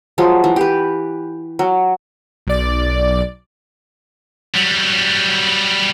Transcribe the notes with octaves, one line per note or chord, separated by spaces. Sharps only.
F3 F#3 G#3
E3
G4 B4
F#3
B1 D5
F#3 G3